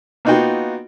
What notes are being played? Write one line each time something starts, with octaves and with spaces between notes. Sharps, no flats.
A#3 B3 D#4 F4 F#4 G5